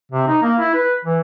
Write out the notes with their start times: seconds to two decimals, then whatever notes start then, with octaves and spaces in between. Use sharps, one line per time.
0.11 C3
0.28 D#4
0.42 A#3
0.59 E4
0.74 B4
1.05 E3